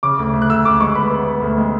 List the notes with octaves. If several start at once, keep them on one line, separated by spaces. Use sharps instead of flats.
C#3 D6
D2
D2
F#6
D2 E6
D2 D6
G#3 C#6
B3 B5
B3
B3
D2
G#3